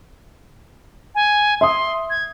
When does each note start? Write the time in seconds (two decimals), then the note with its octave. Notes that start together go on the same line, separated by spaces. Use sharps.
1.15 G#5
1.61 E5 C6 D#6
2.10 G#6